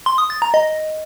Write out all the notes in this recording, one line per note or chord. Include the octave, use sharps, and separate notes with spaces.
C6
D#6
A6
A#5
D#5